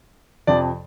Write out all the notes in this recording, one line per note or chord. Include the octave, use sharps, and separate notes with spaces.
F2 C3 F3 D5